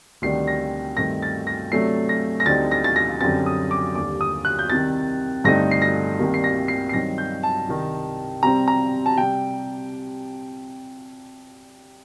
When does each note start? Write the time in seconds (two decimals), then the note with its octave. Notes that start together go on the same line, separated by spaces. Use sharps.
0.22 D2 C3 D#3 G3 D4 C7
0.47 A#6
0.97 G2 D#3 A3 C4 D#4 A#6
1.23 A6
1.47 A#6
1.72 C3 F#3 A3 D4 C7
2.09 A#6
2.40 A#6
2.46 D2 D3 G3 C4 D#4 A6
2.72 A#6
2.84 A6
2.96 A#6
3.21 F#2 D3 G3 C4 A6
3.46 D#6
3.71 D6
3.95 D#2 D3 G3 D6
4.21 D#6
4.45 F#6
4.59 G6
4.70 C2 C3 D#3 A6
5.44 G2 D3 A3 C4 D#4 A#6
5.71 C7
5.82 A#6
6.19 C2 C3 D#3 G3 A#3
6.34 C7
6.44 A#6
6.68 C7
6.89 C7
6.93 G2 D#3 F#3 C4 D#4 A#6
7.18 G6
7.43 A5
7.68 C2 C3 D#3
8.43 C3 G3 C4 A#5
8.68 A#5
9.06 A5
9.18 C3 G3 G5